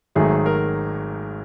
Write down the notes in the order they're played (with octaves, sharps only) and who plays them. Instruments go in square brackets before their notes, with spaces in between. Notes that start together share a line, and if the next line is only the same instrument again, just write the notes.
[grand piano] G#1 G#2 D#3 F#3 A3 G#4
A#4